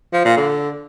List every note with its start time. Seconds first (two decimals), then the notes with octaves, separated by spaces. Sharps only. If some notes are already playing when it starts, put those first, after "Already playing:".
0.13 F3
0.25 A#2
0.37 D3